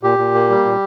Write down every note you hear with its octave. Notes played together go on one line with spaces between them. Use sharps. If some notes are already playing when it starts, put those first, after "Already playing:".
A#2 G4
A#2
A#3
G3
A#2